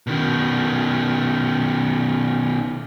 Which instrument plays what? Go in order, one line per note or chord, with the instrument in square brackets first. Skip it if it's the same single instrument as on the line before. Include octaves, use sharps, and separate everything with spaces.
[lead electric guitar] B2 D#3